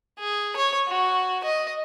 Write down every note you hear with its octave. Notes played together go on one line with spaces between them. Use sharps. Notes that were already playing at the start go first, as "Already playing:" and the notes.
G#4
C#5
F#4
D#5